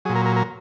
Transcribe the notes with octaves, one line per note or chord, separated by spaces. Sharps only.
A#2 F#3 G#4
A#4
A#4
A#4